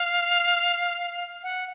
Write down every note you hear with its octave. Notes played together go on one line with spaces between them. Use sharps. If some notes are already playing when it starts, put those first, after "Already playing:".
Already playing: F5
F#5